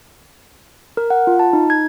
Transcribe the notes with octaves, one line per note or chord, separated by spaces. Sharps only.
A#4
F#5
F4
A5
D#4
G#6